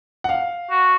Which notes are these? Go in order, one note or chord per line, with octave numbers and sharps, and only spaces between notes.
F#5
F5
F#4